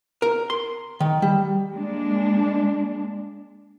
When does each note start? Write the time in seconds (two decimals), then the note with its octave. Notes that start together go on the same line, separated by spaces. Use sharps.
0.22 A#4
0.50 C6
1.00 D#3
1.22 G3
1.71 G#3 A#3 D4